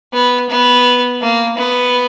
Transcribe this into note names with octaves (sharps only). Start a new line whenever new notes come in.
B3
B3
A#3
B3